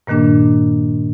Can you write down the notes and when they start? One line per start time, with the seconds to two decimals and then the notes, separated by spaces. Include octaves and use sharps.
0.07 G2 A#2 D#3 A#3 D4